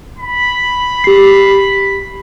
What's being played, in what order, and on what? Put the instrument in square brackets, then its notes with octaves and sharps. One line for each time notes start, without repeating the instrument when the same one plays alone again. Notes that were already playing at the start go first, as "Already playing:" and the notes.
[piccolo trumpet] B5
[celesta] G4 C7